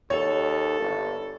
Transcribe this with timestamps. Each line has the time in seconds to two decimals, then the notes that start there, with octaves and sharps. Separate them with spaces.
0.10 D#2 A4 C#5
0.80 G1